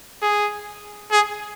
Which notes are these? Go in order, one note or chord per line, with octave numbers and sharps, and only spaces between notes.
G#4
G#4